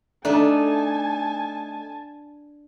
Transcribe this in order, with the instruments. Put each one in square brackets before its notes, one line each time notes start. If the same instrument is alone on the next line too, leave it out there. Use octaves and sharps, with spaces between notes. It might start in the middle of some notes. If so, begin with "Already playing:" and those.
[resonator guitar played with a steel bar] A3 D#4 [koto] D4 [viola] G#5 A5